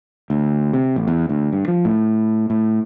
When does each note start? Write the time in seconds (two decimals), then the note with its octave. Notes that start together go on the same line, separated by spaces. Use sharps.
0.30 D2
0.73 C3
0.96 A1
1.08 E2
1.29 D2
1.52 G2
1.68 F3
1.85 A2
2.50 A2